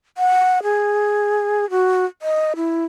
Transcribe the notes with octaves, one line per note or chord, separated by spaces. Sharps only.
F#5
G#4
F#4
D#5
E4